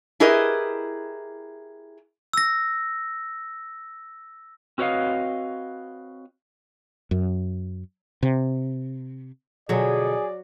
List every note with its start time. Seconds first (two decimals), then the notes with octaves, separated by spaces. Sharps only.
0.20 E4 G4 G#4 A#4 B4 D#5
2.33 E6 A#6
4.78 C4 F#4 B4 C#5 D#5 F5
7.11 F#2
8.23 C3
9.69 B2 D3 F3 F#3 G#4 D5